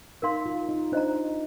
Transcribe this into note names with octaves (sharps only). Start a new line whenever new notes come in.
D#4 A#4 F5 C6
F4
D#4
D4 C5 D#5 A#5